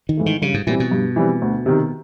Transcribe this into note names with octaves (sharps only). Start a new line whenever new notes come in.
D#3
G#2 E3 A3
D#3
G2 C#3
G#2
A#2 E3 G3 C4
B2
G2
E3 G3 C4
D2
C3 D#3